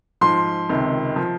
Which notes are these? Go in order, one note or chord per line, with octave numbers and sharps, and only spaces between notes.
G#2 F3 C6
C#2 C3 D#3
F3